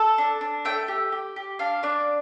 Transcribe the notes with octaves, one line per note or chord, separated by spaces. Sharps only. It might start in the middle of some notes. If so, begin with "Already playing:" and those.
Already playing: A4 A5
D4
D4
A3 G5
G4
G4
G4
D4 F5
D4 D5